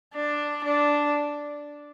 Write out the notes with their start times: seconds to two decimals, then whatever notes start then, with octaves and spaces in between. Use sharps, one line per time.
0.15 D4
0.64 D4